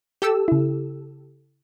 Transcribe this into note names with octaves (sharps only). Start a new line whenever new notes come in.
G4 A4 E6
C#3 E4